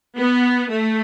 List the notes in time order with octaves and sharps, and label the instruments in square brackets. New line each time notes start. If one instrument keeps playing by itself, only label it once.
[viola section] B3
A3